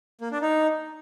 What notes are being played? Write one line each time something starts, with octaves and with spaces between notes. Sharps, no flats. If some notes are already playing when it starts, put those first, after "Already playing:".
A#3
D4
D#4